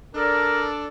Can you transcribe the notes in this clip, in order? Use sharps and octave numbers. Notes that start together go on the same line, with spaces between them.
D4 A4 A#4 D5